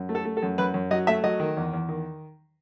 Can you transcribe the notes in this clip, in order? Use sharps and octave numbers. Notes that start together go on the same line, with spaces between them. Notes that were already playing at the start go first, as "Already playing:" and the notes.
Already playing: F#2
A3
A4
A3
A4
F#2
F#2 B4
F#2
F#3 D#5
A3 E5
F#3 D#5
D#3
E2
E2
D#3